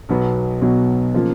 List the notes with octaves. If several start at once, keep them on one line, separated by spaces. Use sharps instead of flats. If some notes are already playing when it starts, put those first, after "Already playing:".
B1 B2 F#3 B3
B1 B2 F#3 B3
C#3 F3 A#3 F4